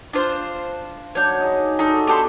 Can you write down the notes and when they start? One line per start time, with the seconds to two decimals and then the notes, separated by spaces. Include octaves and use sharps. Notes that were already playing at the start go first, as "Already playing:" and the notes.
0.13 D4 F4 C5
1.15 F#3 D4 C#5 G6
1.40 D#4 G#4
1.79 D#4 F#4 A4 D5
2.07 B3 D4 G4 A4 C6